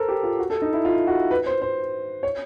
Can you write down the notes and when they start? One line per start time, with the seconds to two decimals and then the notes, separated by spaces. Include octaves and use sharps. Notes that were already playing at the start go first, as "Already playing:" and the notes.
Already playing: A4 A#4 C5
0.08 G4
0.23 F4
0.39 F#4
0.50 A4
0.62 D#4
0.73 E4
0.85 F4
1.07 F#4
1.31 B4
1.46 C5
1.62 C5
2.23 C#5